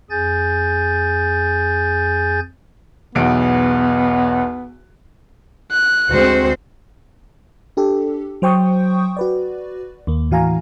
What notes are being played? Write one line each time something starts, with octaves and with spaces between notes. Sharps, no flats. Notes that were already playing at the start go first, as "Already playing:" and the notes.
F2 G#4 G#5 G6 A6
B1 E2 B3 D7
F#6
D2 G#3 C4 F#4 C5
D4 G4 A4
F#3 C5 G5 C#6 D#6 G6
F#4 B4 D5
D#2 A#3
A2 E3 F#4 F5 G#5 A#5